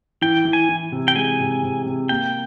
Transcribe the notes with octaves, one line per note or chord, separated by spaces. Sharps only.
E3 G5
E3
G#5
E3
C3
G5
G#3 G#5
C3
C3
C3
A#3 G5